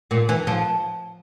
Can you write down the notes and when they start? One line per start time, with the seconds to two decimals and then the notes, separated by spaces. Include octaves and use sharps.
0.11 A#2
0.29 E3
0.47 F3